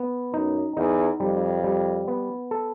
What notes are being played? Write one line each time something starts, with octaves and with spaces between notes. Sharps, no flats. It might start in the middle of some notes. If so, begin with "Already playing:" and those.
Already playing: B3
F#2 D#4
E2 D#4
F2 G3
G3
B3
A4